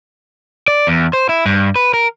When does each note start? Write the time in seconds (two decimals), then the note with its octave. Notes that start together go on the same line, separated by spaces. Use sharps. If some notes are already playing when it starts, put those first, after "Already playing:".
0.68 D5
0.87 E2
1.13 C5
1.29 E4
1.46 G2
1.76 B4
1.94 A#4